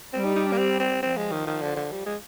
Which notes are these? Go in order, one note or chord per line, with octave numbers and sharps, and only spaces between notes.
G3 C4
D#4
D#4
D4
A#3
C4
C4
F3 C4
G#3
D#3
D#3
D3
D3
G3
G#3